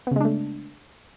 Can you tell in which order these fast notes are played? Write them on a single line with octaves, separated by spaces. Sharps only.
B3 C#3 G#3 D4 A3